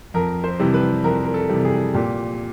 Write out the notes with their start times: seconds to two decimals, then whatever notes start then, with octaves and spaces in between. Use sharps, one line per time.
0.14 F2 A#4
0.44 C5
0.59 C3 E3 G3
0.74 B4
1.04 F2 A#4
1.25 A#4
1.34 A4
1.49 C3 E3 G3
1.65 G#4
1.94 A#2 G4